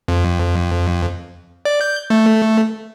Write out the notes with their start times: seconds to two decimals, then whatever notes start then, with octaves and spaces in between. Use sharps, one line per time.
0.08 F2
1.65 D5
1.81 G6
2.10 A3